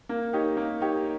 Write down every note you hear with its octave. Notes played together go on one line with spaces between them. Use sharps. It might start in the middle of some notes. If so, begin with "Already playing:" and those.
A#3
D#4 G4 C#5
A#3
D#4 G4 C#5